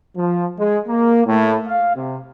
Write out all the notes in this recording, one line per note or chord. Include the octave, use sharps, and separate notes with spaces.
F3
G#3
A#3
A2
F5
C3